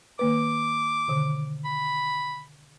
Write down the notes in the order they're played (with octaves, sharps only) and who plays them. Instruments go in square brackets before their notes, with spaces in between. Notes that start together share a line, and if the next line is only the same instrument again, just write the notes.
[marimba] D#3 A#3 B4 [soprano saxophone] D6
[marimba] B2 D3 D#3
[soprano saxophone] B5